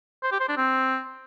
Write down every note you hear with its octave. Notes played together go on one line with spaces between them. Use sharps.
C5
G4
C5
D4
C4